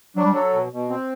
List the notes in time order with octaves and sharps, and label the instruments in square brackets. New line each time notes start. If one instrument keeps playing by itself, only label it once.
[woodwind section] F#3 [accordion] D4
[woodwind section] G3
[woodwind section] F#3 [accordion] A4
[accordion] B2
B2
C4